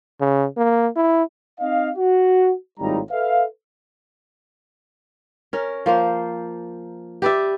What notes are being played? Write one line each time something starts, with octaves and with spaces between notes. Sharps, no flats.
C#3
A#3
E4
C4 D#4 D#5 F5
F#4
G#1 A2 G3 D#4 F4 A#5
A4 B4 E5 F5
C#4 A#4
F3 A#3 C5
G4 B4 D5 E5